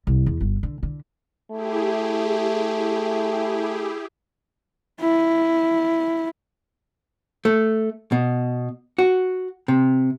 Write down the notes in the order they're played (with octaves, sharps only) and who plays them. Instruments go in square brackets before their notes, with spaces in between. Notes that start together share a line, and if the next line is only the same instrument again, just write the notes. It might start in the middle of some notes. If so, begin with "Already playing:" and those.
[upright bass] C2
E2
G1
D3
D3
[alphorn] A3 [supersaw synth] E4 G4 G#4
[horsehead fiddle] E4
[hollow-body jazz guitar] A3
B2
F#4
C3